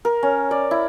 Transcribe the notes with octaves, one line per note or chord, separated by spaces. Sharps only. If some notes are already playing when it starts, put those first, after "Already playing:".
A#4
C#4
D5
E4